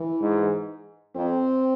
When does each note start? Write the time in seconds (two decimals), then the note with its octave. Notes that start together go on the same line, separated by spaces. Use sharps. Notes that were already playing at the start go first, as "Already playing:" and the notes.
Already playing: E3
0.21 G#2
1.16 F2 C4